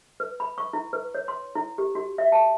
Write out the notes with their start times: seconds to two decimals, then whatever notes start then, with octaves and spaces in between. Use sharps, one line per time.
0.20 B4
0.40 B5
0.58 C#6
0.73 E4
0.93 B4
1.15 C#5
1.28 C6
1.55 E4
1.78 G4
1.95 F#4
2.18 E5
2.32 A5